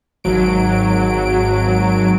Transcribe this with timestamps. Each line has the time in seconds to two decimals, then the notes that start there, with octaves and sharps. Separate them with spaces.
0.24 G#1 F#3 D7